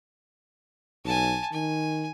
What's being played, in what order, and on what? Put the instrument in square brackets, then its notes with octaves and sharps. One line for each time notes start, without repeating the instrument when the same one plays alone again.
[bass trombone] B1 [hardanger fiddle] G#5 A5
[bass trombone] D#3 [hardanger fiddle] G#5